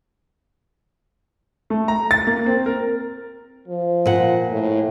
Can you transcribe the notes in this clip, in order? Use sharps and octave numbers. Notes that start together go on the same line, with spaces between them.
A3
A#5
A6
A#3
C4
A#4
F3
A#2 F#5
A2